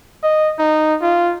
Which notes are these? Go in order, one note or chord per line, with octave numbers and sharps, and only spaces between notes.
D#5
D#4
F4